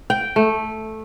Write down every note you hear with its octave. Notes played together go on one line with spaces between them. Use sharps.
G5
A3